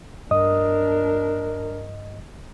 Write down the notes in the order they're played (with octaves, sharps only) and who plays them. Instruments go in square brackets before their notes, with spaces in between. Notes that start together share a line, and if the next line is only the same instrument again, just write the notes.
[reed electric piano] G2 D#5 D#6 [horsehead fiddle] D4 A#4